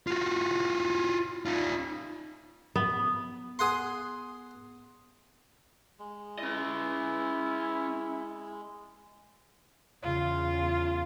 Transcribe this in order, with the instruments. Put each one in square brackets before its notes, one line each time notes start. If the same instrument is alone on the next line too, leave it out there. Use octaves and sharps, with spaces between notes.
[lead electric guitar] F4 F#4
D#4 F4
[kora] B3
[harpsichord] G#4 F#5 C6
[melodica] G#3
[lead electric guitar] C#4 D#5 [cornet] E4
[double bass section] E2 C#3 [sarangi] F4